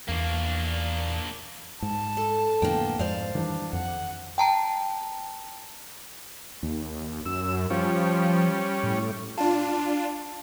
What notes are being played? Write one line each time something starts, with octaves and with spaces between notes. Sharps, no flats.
E2 A#3 D4
G#2 A5
A4
F2 A2 D3 A#3 B3 G5
F2 G#2 C5 D5 F5
D#3 E3 G3 D4
F2 F#5
G5 A5 A#5
D#2
F#2 E6
F3 G3 C#4
A2
D4 F4 A5